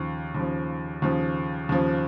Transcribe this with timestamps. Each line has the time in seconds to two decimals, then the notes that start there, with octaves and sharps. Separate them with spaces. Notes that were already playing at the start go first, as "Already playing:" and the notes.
Already playing: D#2 C#3 F3
0.35 D#2 C#3 F3
1.02 D#2 C#3 F3
1.69 D#2 C#3 F3